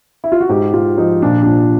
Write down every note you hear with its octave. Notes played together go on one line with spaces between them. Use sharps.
E4
F4
F#4
G#2 G4
G#2 F4
F3 D#4
A#2 D4
A#2 D4